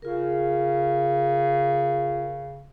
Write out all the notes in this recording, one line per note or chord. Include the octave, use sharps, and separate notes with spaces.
C#3 F4 G#4 A#4